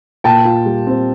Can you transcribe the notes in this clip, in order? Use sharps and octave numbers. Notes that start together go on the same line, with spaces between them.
A#2 G5 A5
F4
G3
C4